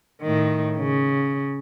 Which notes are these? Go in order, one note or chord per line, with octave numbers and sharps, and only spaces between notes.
A2 D#3
C#3